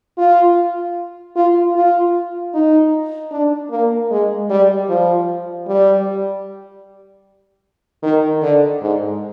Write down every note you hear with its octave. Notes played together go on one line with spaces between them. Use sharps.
F4
F4
F4
D#4
D4
A#3
G#3
G3
F3
G3
D#3
D3
G#2